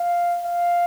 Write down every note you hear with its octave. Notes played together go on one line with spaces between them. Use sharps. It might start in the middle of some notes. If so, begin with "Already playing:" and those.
Already playing: F5
F5